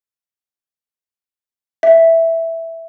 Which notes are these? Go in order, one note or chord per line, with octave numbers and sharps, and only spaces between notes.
E5